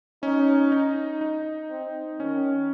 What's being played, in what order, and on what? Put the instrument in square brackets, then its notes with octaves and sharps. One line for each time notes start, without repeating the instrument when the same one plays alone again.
[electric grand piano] C#4 [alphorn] D#4
[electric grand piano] D#4
D#4
[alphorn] C4
[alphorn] D#3 [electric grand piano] C#4